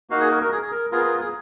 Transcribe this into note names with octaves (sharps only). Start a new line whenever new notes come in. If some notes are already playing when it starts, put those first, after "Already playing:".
A#3 D#4 F#4 F5
G#4
A#4
A#4
G#4
G#4
A#4
B3 F4 G#4 A#4
A#4
G#4